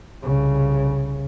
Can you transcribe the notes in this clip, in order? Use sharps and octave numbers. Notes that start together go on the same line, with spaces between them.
C2 C#3